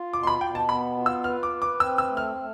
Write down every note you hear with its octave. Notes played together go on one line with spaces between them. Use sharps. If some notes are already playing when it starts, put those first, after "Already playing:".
Already playing: F4
B2 D6
C6
B5
B2 G5
A5
B3 B5
F4
E6
B4 F6
D6
B4
D6
C4 E6
E6
A3
F6
A3